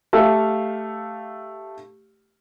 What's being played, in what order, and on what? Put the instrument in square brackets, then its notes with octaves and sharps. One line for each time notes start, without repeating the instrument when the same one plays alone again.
[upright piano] A3 G4 A4 F5